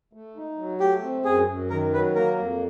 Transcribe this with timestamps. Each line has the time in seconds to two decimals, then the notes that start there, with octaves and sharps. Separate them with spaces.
0.13 A3
0.36 D#4
0.58 F#3
0.80 A3 G4
1.03 C4
1.25 F#2 G#4
1.48 F#2
1.70 D#3 A#4
1.93 F#3 B4
2.15 A#3 A#4
2.38 F2